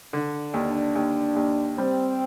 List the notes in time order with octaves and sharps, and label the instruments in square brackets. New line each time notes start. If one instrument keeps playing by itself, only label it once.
[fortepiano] D3 [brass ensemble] D4
[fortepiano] D#2
D#2
D#2
[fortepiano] G3 [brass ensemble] C4